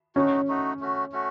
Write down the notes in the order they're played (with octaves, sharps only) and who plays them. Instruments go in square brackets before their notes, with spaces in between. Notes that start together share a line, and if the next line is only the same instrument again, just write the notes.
[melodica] A3 D#4 F#4 [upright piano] C#4
[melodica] A3 D#4 F#4
A3 C#4 F#4
A3 C#4 F#4